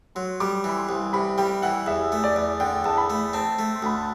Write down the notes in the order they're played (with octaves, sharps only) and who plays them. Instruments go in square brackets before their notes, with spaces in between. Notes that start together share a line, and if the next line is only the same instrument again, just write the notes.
[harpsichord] F#3 [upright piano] C6
[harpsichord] G3 [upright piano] D6
[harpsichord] E3 [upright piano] B5
[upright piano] C6
[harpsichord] C2
[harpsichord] C3 [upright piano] B5
[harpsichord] G3 [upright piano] G5
[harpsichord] E3 [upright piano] F#5
[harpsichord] E2 [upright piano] E5
[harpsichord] A3
[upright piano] D5
[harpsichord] E2
[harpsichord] D3 [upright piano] G5
[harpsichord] E2 [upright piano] A5
[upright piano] B5
[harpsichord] A3
[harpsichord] C4 [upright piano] A5
[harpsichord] A3
[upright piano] C6
[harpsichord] D2 [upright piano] B5
[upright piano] A5